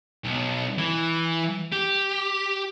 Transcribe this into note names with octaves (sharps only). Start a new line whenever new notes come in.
B1
E3
G4